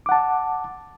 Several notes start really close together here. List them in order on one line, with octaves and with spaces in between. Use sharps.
D6 F#5 A5